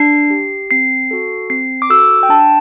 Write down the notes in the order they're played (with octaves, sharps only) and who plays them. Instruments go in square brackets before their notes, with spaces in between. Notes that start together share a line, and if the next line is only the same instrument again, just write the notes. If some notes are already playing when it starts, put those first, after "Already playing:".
Already playing: [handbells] D4 C7
G4
C4 C7
F#4 A4
C4 C7
D6
F#4 A4 E6
G5
D4 A5